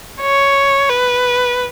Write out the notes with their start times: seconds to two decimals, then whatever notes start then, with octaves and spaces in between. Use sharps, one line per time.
0.22 C#5
0.90 B4